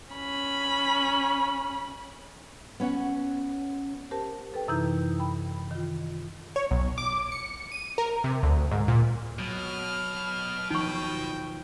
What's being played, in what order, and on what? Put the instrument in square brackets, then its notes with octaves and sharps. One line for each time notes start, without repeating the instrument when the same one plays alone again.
[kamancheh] C#4 B5
[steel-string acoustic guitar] B3 C#4 C#5 F#5
[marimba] G4 A#4 C5 A5
A4 B4 G5
F#2 C3 E3 D#4 E4 G6
G5 B5
D#3 F4
[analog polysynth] C#5
B1
D6
C#7
D#7
A#4
C3
D2
G#2
A#2
[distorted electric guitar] B2 [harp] F#3 [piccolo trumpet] F6
[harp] D#2 D#3 F3 [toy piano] D#4 C#6 [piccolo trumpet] G5